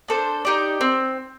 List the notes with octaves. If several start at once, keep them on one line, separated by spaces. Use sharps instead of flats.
D4 A4 C5
D#4 G4 D5
C4